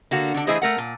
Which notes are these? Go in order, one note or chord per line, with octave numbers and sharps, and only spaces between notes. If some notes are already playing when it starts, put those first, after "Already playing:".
D3 A#3 F#4
D3 D4
E3 A3 E4 G#4 C5 D#5
A3 A#4 F#5
A#2